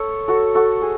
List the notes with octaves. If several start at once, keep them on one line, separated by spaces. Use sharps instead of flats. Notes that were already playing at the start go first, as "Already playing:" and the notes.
Already playing: A4 C#5
F#4 A4
F#4 A4
G#4